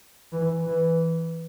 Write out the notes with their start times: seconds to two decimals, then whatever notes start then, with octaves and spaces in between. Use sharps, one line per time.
0.32 E3
0.65 E3